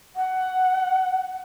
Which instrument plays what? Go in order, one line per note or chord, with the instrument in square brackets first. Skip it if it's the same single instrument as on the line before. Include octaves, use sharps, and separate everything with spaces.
[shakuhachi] F#5